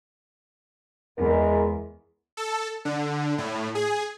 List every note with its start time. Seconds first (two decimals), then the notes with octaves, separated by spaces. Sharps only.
1.18 E2 G#3 A#4
2.37 A4
2.85 D3
3.38 A2
3.75 G#4